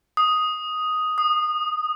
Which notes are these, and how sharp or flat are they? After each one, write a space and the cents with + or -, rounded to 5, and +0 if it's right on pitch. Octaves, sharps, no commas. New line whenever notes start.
D#6 +5
D#6 -20